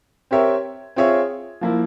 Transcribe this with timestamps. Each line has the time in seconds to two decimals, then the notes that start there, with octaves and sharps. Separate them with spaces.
0.31 C4 G4 A#4 C#5 E5
0.96 C4 F4 G#4 C#5 E5
1.61 F3 A#3 E4